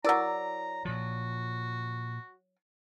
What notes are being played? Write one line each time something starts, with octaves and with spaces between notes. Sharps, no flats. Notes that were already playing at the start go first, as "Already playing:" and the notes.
F#3 E4 A#4 D5 A#5
A#2 F3 F#4